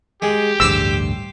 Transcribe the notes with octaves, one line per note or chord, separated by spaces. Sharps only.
G#3 G4
A1 D2 G2 C5 C6 D6 E6